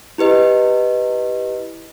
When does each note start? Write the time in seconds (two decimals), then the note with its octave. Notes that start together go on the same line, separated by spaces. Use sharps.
0.18 E4 G4 B4 D#5